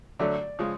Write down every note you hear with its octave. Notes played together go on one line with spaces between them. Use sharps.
D3 F#3 A3 D5
C#3 F3 G#3